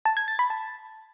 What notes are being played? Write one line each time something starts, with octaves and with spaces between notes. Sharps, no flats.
A5
G#6
A6
B5
A5